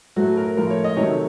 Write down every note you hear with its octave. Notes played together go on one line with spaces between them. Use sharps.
A2 F#3 A3 F#4
A#4
A2 F3 A3 A#4
C#5
D#5
C3 D#3 F#3 A3 C#5